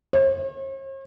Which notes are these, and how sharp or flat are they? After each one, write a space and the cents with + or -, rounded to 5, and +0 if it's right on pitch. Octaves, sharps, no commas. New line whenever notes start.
C#5 -45